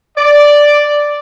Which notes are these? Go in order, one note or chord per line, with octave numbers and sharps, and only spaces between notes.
D5